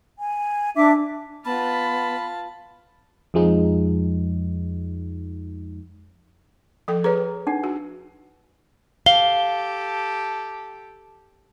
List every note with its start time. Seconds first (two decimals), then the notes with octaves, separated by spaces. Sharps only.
0.18 G#5
0.76 D4 E5 D6
1.45 B3 F4 A5 B5
3.34 F2 F3 G#3 D#4
6.88 F3 A4 G5
7.04 G#4 B4 C#5 A#5
7.47 D4 D#4 F#5
7.64 F#4
9.06 G4 A4 F5 G7